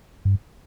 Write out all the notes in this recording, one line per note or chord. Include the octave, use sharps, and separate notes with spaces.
G2